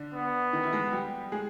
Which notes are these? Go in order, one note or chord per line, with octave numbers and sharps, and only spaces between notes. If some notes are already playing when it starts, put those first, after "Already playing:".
Already playing: D3 D4
B3
D#3 D#4
E3 E4
G#3 G#4
G3 G4
G#3 G#4